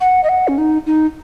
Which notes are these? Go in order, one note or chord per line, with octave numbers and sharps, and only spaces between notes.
F#5
D#5
F#5
C#4
D#4
D#4